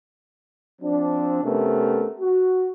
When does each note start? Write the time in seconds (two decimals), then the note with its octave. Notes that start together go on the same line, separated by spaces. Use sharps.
0.82 F3 C4 D4
1.44 C3 A3 B3 C#4 A#4
2.20 F#4